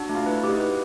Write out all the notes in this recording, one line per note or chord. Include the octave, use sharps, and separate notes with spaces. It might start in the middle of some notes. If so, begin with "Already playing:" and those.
Already playing: D4 F#4
A3
F4
E4 B4
G4
D#4
B4